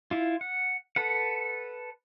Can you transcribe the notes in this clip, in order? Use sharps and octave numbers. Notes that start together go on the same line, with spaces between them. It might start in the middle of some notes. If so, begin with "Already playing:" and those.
E4 F4
F#5
A4 B4 F#5